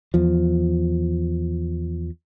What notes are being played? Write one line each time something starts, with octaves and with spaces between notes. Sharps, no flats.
E2 F3